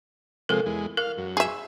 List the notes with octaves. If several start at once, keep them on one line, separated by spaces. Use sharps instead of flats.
C3 F3 G#3 A4 A#4
E2 G#3
A#4 F5
F#2
G#4 E5